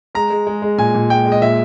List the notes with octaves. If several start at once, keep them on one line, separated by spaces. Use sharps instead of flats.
G#3 A#5
G#3
G#3
G#3
A#2 G#5
A#2
G#3 G5
G#3
D#5
A#2 E5